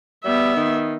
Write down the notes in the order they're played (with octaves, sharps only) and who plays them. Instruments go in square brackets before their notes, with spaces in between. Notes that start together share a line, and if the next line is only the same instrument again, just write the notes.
[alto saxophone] G3 [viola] B3 E5
[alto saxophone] D#3